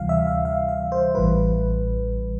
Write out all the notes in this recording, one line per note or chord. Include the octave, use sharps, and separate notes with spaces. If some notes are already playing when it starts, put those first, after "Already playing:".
Already playing: D2 C3 E3 G3 F5
E5
F5
F5
E5
C5
A1 A2 E3 G3 B4